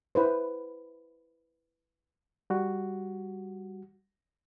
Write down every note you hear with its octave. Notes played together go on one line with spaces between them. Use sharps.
E4 B4 C5
G3 F#4